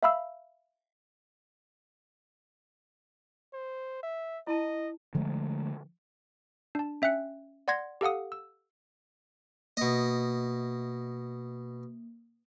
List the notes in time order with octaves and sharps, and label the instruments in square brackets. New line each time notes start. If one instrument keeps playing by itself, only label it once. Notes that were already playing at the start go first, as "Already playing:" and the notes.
[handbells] E5 F5 B5 E6
[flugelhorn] C5
E5
[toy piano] E4 A5 [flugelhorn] D#5
[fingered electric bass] D3 F3 G#3 A3
[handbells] D4 A5
C#4 E5 G5 F#6 C#7
D5 F#5 C6 G#6 A#6
G4 A4 F5 F#5 D#6
E6
[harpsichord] B2 D#5 [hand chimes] A#3